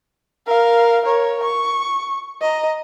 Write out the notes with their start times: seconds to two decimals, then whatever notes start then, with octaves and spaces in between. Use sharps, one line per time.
0.47 A#4 F5
1.05 A#4 C#5
1.44 C#6
2.41 D#5 A#5